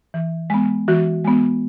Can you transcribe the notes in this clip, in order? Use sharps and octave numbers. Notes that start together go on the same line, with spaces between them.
E3
G#3 B3
E3 F#4
G#3 B3